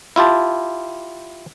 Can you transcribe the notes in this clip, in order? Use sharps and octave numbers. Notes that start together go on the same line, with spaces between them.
E4 F4 G4 A5